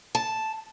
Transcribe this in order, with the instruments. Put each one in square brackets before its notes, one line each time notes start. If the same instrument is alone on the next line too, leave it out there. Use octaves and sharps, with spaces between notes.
[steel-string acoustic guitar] A5